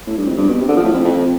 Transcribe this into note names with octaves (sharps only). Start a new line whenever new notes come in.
A2
G2
F2
G2
B2
C3
D3
F3
A2
F2
F2